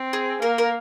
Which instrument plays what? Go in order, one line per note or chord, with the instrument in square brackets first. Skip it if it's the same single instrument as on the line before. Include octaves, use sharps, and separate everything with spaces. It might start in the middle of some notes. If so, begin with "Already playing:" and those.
Already playing: [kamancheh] C4
[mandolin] G#4
[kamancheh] A#3 [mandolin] A#4
[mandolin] A#4